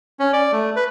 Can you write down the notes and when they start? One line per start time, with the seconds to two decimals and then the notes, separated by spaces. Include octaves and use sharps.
0.19 C#4
0.33 D5
0.52 A3
0.76 B4